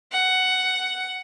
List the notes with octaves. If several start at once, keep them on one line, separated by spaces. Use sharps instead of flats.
F#5